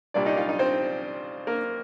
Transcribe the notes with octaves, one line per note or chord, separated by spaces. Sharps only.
C2 A#2 G3 D4 D5
D#4 D#5
F4 F5
D#4 D#5
C4 C5
A#3 A#4